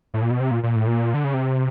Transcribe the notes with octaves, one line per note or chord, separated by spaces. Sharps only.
A2
A#2
B2
C3
A#2
A#2
A2
A#2
D3
C#3
C3